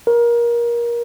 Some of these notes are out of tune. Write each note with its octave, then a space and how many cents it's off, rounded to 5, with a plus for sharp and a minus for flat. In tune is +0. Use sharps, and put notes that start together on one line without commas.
A#4 +25